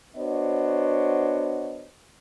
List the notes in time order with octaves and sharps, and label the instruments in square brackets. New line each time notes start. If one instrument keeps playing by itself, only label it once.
[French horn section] B3 D4 F#4 C5 C#5 D#5